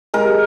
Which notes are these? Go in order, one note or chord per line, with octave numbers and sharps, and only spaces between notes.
G#3 A#4